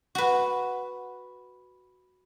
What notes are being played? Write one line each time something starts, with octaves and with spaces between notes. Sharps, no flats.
F#4 B4